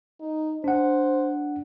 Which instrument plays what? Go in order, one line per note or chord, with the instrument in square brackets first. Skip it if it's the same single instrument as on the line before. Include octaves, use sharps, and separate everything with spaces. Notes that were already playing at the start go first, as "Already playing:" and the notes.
[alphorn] D#4
[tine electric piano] D4 F#5 [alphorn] C5